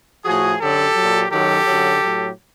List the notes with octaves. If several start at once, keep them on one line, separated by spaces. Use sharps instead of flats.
A2 F3 F#4 G#4
F#2 D3 F#3 G4 A4
A#2 F#3
F#2 D#3 F#3 G4 A4
F#2 D3 F#3
A2 F#3